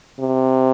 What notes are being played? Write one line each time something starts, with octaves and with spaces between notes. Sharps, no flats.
C3